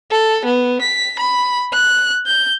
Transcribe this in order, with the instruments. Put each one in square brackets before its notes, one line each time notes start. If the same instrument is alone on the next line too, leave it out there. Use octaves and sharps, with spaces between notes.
[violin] A4
B3
B6
B5
F#6
G6